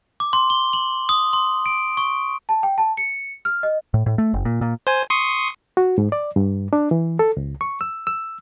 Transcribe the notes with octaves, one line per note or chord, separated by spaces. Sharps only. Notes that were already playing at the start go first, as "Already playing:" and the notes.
D6
C6
G7
F#7
D#6
C6
D7
C#6
A5
G5
A5
C#7
F6
D#5
A2
A2
A3
F#1
A#2
A#2
C5 G#5
C6 C#6 D#6
F#4
G#2
D5
G2
D4
E3
A4
C#2
C#6
E6
E6